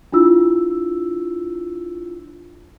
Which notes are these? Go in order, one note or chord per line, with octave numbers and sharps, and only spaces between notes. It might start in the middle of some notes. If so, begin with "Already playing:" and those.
D4 E4 F4 E6